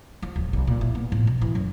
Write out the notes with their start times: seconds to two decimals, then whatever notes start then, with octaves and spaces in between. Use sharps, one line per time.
0.22 F3
0.36 D1
0.53 B1
0.67 A#2
0.81 E4
0.95 B3
1.12 A2
1.27 B2
1.41 E3
1.55 F#2